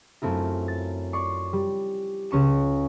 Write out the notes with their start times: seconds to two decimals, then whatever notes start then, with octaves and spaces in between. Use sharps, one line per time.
0.22 F#2 A3 C4 E4 F4
0.68 A6
1.13 D5 C6 C#6
1.53 G3
2.31 C#2 C#4 C#6 E7